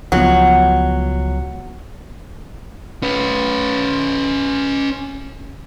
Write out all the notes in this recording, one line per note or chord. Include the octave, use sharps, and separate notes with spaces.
C#2 F3 F#3 B3
C#4 B4